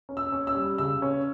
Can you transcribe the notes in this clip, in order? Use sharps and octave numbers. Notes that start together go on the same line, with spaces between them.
C#4
E6
C#4
E6
G3
C#3 E6
C#4